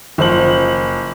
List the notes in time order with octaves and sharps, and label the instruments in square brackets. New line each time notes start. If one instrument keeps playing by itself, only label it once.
[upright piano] F#1 F3 C5 F#7